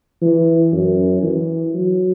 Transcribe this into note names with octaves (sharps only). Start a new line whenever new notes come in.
E3
F#2
E3
F#3